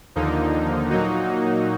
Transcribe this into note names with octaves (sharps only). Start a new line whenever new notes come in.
D#2 D3 F3 A#3 D#4
A#2 F#3 A#3 D#4 F#4